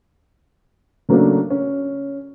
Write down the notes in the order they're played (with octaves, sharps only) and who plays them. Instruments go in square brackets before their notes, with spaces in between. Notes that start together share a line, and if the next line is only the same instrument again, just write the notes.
[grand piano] C#3 F#3 A3 A#3 D4
C#4